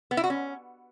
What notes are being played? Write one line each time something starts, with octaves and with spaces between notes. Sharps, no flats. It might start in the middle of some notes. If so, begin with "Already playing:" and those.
B3
E4
F#4
C#4